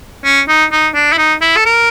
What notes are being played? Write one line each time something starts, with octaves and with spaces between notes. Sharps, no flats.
C#4
D#4
D#4
D4
E4
D#4
E4
A4
A#4